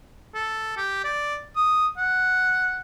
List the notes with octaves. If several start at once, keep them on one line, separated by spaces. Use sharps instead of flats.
A4
G4
D5
D#6
F#5